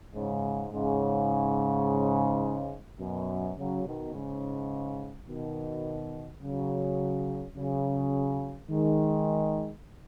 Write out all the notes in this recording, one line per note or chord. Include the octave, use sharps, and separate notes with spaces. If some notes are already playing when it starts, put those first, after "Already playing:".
G#2 C#3
G#2 C#3
F#2 B2
C#3 F#3
B2 D#3
G#2 C#3
B2 D#3
C#3 F#3
C#3 F#3
D#3 G#3